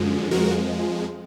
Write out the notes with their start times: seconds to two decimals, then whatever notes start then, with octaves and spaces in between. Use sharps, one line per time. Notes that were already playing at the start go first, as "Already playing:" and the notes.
Already playing: F#2 D3 F3 G#3
0.31 F2 F3 G#3 F#4 A#4